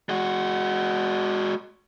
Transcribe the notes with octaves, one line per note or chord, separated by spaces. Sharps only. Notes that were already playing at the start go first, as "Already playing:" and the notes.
G#3 F#4